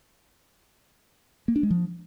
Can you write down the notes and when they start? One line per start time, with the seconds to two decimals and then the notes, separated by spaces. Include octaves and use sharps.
1.48 A#3
1.56 D4
1.63 G#3
1.71 F3